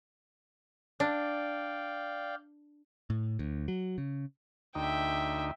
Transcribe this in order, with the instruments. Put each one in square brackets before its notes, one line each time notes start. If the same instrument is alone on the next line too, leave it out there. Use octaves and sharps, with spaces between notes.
[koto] D4 [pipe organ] D5 F5 G5
[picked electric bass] A2
D2
F#3
C#3
[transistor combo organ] D2 D#4 [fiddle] E5 G5